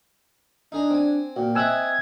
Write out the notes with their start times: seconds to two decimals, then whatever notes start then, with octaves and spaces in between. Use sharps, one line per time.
0.72 D4 D#4 G#4 A#5
0.90 C4 G#5
1.36 A#2 F#4 G5
1.56 C4 D#5 E5 G#5 E6 F#6 G#6